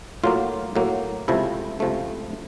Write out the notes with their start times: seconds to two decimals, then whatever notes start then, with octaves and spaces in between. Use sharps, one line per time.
0.24 A2 F#3 A#3 F4
0.76 A2 F#3 A#3
1.28 C#2 C3 F3 A3 E4
1.80 C#2 C3 F3 A3